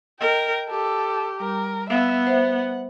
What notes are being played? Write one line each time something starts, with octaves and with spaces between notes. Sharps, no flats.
A#4 D#5 G5
G4 A4
G3 A#4
B3 E5 F5
C5 E5 F#5